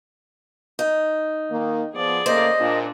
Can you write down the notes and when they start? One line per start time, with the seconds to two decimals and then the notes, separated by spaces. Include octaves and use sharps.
0.79 D#4
1.50 D#3 A#3
1.94 F3 B3 G#4 D5
2.26 A2 C#3 A#3 C5 D#5
2.60 A#2 D4